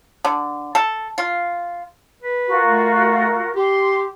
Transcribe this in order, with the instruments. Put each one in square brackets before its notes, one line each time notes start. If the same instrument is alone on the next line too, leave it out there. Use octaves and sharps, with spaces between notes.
[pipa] D3
A4
F4
[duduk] B4
[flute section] F4 F#4 A#4
[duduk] A3
[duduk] G4 [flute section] C6